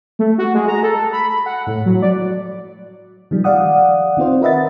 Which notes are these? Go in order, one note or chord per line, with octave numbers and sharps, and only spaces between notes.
A3
F#4
G#3
A#5
A4
B5
F#5
A2
F#3
D5
D#3 F3 G3
D5 F5 F#5 D#6
D#3 C4 F4 C5
A#4 B4 D#5 E5 F#5 A6